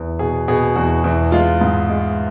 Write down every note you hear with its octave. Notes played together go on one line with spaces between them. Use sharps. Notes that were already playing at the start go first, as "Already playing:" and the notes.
Already playing: E2
B2 G#4
B2 G#4
E2 F#4
E2
G#3 F4
G#2
G#3